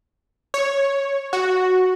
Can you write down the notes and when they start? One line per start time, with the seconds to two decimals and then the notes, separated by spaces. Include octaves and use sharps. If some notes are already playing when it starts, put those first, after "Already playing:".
0.54 C#5
1.33 F#4